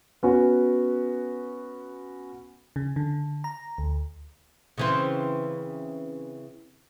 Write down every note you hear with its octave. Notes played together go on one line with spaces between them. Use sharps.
B3 C#4 F#4
C#3
D3
A#5
D2
C#3 E3 C4